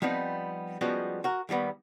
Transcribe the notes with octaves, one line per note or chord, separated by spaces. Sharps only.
F3 G3 B3 C4 D#4
F3 G3 G#3 B3 C#4 F#4
F#4 A#4
D#2 D#3 G3 B3